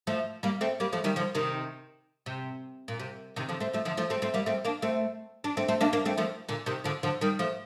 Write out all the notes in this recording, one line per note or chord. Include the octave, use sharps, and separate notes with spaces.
F3 A3
G3 A#3
A3 C4
G3 A#3
F3 A3
D#3 G3
D3 F3
C3 D#3
C3
A#2
C3
C3 D#3
D3 F3
A3 C4
F3 A3
D3 F3
F3 A3
A3 C4
A3 C4
G3 A#3
A3 C4
A#3 D4
A3 C4
D4
A3 C4
A3 C4
A#3 D4
A#3 D4
A3 C4
F3 A3
A#2 D3
C3 D#3
D3 F3
D3 F3
D#3 G3
F3 A3